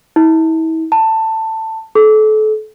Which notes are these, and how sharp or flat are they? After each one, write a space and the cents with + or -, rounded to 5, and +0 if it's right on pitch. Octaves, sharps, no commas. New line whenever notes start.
E4 -40
A5 +15
A4 -30